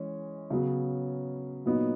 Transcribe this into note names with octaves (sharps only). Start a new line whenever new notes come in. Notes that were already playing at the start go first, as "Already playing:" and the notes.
Already playing: E3 G#3 C#4
C#3 F#3 B3
A#2 F#3 B3 D#4